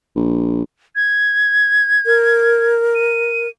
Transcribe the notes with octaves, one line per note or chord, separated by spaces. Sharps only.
A#1
G#6
A#4
D#7